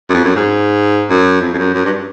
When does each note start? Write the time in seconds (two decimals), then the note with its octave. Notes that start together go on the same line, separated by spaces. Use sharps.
0.10 F#2
0.14 F2
0.25 F#2
0.36 G#2
1.10 F#2
1.42 F2
1.53 F2
1.58 F#2
1.74 F#2
1.85 G2